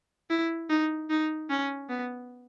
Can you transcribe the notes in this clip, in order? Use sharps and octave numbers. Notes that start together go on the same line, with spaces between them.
E4
D#4
D#4
C#4
B3